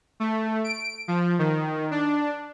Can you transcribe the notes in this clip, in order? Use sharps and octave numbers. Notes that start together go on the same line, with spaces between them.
A3
D7
F3
D#3
D4